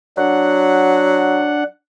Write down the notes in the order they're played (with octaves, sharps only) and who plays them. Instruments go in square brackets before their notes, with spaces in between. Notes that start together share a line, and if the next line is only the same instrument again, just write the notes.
[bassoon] F#3 [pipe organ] D4 F#5